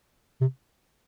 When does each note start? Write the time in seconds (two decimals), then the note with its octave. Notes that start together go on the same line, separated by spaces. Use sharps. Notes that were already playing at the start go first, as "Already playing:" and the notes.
0.41 C3